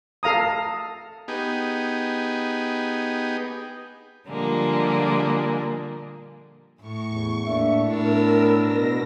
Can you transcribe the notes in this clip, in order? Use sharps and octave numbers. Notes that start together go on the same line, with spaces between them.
A4 F5 A#5 D#6
B3 D#4 G4 G#4
A#2 D3 F3 G3 G#3 A#3
A2 C#6
E2
A2 A#3 D4 E5
A2 B3 D4 A#4 E6
B2 A#6